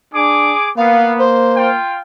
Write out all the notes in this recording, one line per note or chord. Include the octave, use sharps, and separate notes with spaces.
D4 G#4 D6
A#3 B3 F5
C5
F4 G5